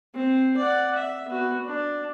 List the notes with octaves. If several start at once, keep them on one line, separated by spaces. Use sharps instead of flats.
C4
D5 F#5
E5
B3 F#4
D4